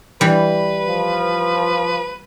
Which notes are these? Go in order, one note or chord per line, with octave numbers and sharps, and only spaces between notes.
E3 G3 B4
F3